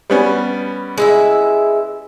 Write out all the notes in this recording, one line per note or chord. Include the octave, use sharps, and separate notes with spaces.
G3 B3 C#4
G#3 E4 E5